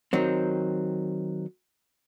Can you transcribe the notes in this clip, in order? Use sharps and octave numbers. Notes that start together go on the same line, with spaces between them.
D#3 F#3 C4